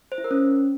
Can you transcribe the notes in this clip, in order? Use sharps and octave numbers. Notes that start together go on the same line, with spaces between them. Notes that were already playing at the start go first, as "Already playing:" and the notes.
C5
E4
A#4
C#4